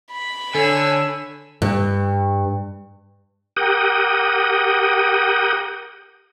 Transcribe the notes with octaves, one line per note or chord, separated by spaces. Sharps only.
B5
D3 A4 C#5 G#5 E6
G2
G4 A#4 F#5 G5 D#6